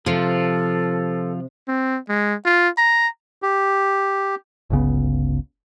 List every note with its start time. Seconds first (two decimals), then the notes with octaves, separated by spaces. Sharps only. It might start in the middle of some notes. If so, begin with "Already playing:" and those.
0.06 C3 F3 F4 A4
1.68 C4
2.08 G#3
2.46 F4
2.78 A#5
3.42 G4
4.70 G1 C#2 C#3 B3